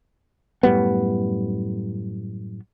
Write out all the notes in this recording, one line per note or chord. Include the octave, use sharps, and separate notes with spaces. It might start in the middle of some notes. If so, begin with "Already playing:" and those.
F#2 A2 G3 B3